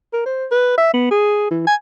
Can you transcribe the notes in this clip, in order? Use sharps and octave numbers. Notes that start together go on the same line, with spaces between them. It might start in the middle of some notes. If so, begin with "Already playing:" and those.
A#4
C5
B4
E5
B3
G#4
E3
G#5